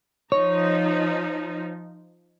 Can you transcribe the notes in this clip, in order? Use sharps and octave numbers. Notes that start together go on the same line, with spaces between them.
F3 D#4 C#5